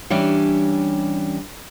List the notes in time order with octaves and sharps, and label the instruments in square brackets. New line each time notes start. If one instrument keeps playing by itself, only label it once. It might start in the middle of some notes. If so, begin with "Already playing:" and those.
[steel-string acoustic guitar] E3 G3 C#4 D4 G4